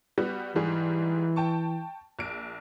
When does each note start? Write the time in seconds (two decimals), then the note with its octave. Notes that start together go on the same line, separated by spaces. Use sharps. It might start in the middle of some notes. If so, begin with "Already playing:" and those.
0.18 G3 B3 F#4
0.55 G#2 E3 G3 G#4
1.36 G5 A5 C#6
2.19 A#1 D7